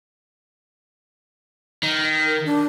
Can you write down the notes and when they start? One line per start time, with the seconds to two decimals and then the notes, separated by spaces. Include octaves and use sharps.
1.83 D#3
2.26 A#4
2.45 D4